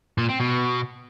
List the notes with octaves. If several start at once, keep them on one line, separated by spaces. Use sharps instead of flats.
A#2
C4
B2